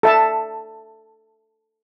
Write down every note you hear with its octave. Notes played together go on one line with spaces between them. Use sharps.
A4 E5 A5